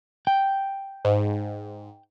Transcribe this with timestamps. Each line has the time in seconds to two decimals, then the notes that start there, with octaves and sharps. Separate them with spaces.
0.27 G5
1.05 G#2